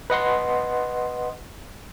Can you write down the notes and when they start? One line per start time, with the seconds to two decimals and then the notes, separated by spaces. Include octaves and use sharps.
0.10 B4 D#5 F#5 C6